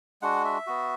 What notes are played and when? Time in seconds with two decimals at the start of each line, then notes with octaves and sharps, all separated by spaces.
0.22 G#3 D4 F#4 F#5
0.45 E5
0.67 B3 F#4